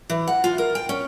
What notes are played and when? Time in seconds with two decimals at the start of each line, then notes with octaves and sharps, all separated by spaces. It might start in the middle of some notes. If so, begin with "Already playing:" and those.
0.10 E3
0.27 F#5
0.44 F4
0.58 A#4
0.75 G5
0.89 C#4